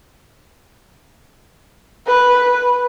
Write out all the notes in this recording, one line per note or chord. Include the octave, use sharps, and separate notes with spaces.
B4